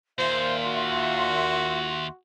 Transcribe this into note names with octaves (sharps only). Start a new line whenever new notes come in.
D#2 A#2 F4 C5 E5 C6
F#4